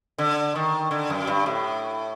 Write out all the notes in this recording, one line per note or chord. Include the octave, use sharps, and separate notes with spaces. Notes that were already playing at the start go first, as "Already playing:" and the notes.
D3
D#3
D3
F#2
G2
A2